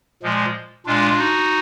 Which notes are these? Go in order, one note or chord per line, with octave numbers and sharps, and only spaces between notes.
A#2 F3 G#3
A#2 G#3 D4 F4
D#4 F#4